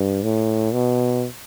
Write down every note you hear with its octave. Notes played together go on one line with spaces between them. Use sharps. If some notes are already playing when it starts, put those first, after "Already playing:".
Already playing: G2
A2
B2